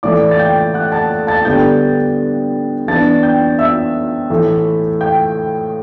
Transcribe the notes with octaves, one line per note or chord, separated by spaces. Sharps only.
A2 E3 A3 D5 D6
A6
G5 G6
F#5 F#6
A5 A6
A5 A6
D3 G3 B3 D4 G5 G6
E3 B3 D4 A5 A6
G5 G6
E5 E6
A2 E3 A3
G5 G6